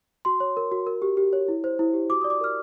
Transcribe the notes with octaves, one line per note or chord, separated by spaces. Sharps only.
F#4 C6
C#5
A#4
F#4
A#4
G4
G4
C#5
E4
C5
E4
G4
F#4 D6
D5 D#6
D6
A#4 F6